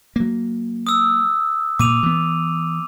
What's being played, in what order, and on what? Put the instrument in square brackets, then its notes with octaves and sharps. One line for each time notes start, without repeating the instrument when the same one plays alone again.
[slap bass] F#3 A#3
[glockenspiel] D#6 E6
[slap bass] A#2 [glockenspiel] D6 D#7 F7
[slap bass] E3 B3